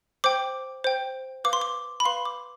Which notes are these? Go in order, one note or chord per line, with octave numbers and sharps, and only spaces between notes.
C5 G5 D6
C5 G5
B4 F5 D6
C6
D6
B5
B4 F5 C6
D6